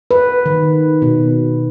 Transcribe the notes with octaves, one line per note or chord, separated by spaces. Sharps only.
B4
D#3
B2